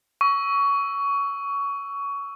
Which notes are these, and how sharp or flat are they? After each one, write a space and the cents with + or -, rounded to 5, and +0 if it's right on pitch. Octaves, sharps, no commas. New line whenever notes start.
C#6 +20 E6 +0